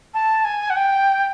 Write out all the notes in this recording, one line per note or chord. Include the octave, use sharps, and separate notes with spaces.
A5
G#5
F#5
G5